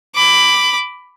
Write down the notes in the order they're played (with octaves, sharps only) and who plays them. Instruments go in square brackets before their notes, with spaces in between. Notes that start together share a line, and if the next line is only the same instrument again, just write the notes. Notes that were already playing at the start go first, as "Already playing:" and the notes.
[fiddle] B5 D6